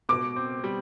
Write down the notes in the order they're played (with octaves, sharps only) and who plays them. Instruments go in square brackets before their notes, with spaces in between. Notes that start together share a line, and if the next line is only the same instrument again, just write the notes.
[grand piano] B2 [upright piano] D6
[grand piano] C4
G3